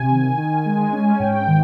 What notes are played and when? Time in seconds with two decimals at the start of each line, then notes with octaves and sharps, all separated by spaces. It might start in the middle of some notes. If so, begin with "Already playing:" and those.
Already playing: C3 G#5
0.11 D#3
0.38 D#3
0.66 G#3
0.93 C#4
1.20 G#2 G5
1.47 D#3